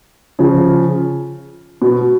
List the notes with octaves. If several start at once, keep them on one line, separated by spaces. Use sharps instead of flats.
C#3 F3
B2